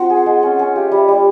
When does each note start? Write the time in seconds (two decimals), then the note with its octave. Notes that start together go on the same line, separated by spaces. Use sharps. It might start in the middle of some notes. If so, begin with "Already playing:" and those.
Already playing: C4 F4 C5 F#5
0.10 G#4
0.26 G#3
0.43 C#4
0.59 C#4
0.76 G4 F5
0.88 G3 E5
1.00 D#5
1.08 G3 D5